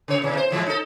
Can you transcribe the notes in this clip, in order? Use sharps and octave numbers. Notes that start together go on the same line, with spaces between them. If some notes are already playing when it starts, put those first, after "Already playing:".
C#3 C#5
E2 C3
C5
A2 E3 G#3
D#4 A4